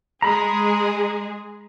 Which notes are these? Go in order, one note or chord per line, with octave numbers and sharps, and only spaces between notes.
G#3 G#4 A#5 B5